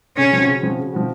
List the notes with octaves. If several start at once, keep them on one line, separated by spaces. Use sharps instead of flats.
C#3 C#4
F3 C4 F#4
C#3
F3 C4 F#4
C#3
F3 C4 F#4